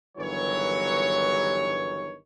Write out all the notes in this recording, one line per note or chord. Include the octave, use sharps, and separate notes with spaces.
G1 G2 D#3 E3 F#3 C#5